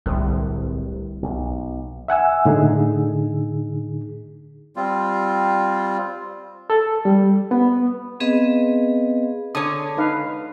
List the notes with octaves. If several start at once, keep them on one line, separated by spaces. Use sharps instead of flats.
D1 C2
B1
E5 F#5 G#5 E6
A2 D3 D#4 G#4
G3 C4 F4
A4
G3
B3
B3 C4 G#4 B4 D#5 F5
D3 C#5 D#6
D#4 B4 F5